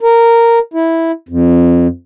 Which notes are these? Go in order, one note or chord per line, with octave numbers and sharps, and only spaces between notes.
A#4
E4
F2